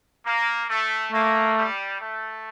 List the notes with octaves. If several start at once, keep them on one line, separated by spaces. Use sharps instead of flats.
A#3
A3
A3 A#3
G3
A3